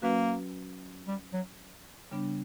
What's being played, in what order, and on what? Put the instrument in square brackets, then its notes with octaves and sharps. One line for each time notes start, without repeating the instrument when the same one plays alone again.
[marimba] F#3 C#4 F#4 B4 [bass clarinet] A#3
[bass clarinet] G3
F#3
[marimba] C#3 G3 B3 D4